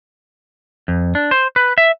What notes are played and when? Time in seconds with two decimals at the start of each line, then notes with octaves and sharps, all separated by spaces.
0.88 F2
1.15 D4
1.31 C5
1.56 B4
1.78 E5